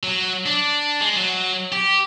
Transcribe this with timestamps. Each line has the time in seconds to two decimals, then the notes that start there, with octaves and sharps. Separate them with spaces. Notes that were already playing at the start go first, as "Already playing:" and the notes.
0.03 F#3
0.46 D4
1.01 G#3
1.16 F#3
1.72 G4